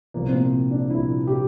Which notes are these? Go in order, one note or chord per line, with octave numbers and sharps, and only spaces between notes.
C2 A#2 F3 A#3
C4
A#3
D4
C2 A#2 F3 E4
G4